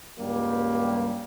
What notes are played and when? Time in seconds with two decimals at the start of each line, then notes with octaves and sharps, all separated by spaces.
0.19 C#2 G2 G3 A#3